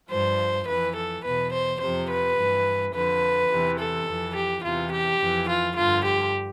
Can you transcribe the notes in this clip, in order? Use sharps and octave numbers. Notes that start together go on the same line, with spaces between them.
G2 F3 C5
F2 E3 B4
A4
E2 B2 B4
C5
F2 C3 F3 C5
B4
G2 E3
F2 D3 F3 B4
E2 C3 E3
A4
F2 E3
G4
E2 C3 E3 F4
G4
F2 E3
F4
G2 D3 F3 F4
G4